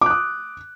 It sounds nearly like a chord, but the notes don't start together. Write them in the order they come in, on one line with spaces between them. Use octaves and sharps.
D6 F#6 D#6